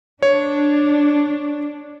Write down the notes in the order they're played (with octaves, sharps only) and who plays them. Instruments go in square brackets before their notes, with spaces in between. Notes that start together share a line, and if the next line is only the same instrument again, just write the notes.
[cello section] D4 [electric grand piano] C#5